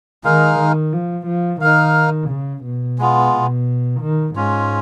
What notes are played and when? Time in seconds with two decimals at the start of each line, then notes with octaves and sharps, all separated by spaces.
0.24 D#3 G#3 D#4 A#4 F5
0.59 D#3
0.93 F3
1.27 F3
1.61 D#3 D#4 A#4 F5
2.30 C#3
2.65 B2
2.99 G#3 B3 F4
3.32 B2
4.01 D#3
4.36 G#2 G#3 C#4 F4